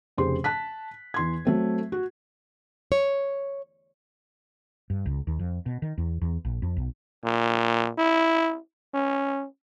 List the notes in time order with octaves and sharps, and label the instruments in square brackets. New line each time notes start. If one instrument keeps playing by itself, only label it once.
[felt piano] F1 C#3 G4 G#4 C5 C6
A5 F#6 B6
E2 C6 G#6
F#3 A3 C4
F#4
[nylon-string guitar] C#5
[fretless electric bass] G2
C#2
D#2
F2
B2
D#3
E2
E2
A#1
F2
B1
[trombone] A#2
E4
C#4